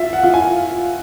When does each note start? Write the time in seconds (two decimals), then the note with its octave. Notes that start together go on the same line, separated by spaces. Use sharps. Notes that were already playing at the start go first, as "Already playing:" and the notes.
Already playing: F4 E5
0.13 F#5
0.23 F4
0.34 G#5